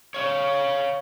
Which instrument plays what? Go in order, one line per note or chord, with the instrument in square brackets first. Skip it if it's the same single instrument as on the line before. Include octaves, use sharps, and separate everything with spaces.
[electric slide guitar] C#5 F5